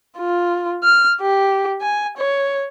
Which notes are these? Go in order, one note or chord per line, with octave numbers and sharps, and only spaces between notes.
F4
F6
G4
G#5
C#5